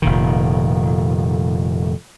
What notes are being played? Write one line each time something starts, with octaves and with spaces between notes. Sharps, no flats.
F1 A#2 D#3